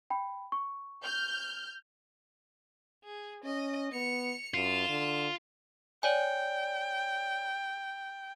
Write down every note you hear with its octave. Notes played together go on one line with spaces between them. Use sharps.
G5 B5
C#6
F6 G6
G#4
C#4 D#5
B3 C#7 F7
F#2 F4 E7
D3
C#5 D5 G5 G#5